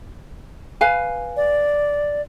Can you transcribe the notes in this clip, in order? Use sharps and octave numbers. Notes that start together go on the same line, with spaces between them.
B4 F5 G#5
D5